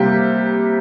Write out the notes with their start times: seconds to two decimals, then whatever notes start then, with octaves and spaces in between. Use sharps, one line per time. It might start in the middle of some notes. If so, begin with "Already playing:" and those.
Already playing: C3 G3 A#3 G4